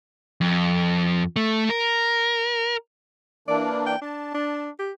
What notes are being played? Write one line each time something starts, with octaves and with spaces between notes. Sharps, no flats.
F2
A3
A#4
E3 A#3 D4 D5
G5
D4 A5
D4
G4